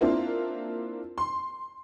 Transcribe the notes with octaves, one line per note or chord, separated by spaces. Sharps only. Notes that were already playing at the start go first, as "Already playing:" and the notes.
A#3 C4 D4 E4 F4
C6